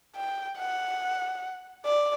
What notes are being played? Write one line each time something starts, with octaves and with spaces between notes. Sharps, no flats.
G5
F#5
D5